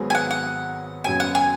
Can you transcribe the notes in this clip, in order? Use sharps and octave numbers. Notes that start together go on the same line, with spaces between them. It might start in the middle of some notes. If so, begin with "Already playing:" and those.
Already playing: G#1 G#2 F#3 B3 G#4
G#5
F#5
F#5
F#1 F#2 C#3 F#3 B3 G#5
F#5
G#5